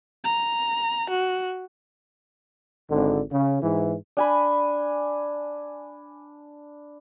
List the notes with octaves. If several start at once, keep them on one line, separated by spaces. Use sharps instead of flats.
A#5
F#4
G#1 D3
C#3
G#2 E3
D4 G#5 B5